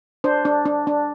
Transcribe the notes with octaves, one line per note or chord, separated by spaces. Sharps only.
D4 C5
D4
D4
D4